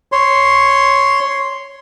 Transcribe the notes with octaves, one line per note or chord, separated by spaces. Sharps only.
C#5 C6